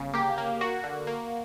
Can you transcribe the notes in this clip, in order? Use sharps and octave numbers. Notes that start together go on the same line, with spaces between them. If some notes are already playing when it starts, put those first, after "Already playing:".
Already playing: G1 C#3
A#3 G4
A#3
A#3 F#4
D3
A#3